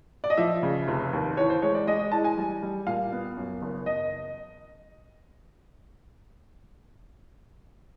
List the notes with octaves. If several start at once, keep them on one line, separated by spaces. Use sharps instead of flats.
D5
D#5
F3 E5
C#3
F1
D#2
E3 C#5
C5
G#3 C#5
D5
G#3 D#5
D#5
E3 A5
G#5
G3
G3
A#2 F5
B3
F#2
F#1
F#1 D#5